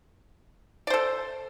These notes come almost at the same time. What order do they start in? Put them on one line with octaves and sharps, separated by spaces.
D5 C5 A4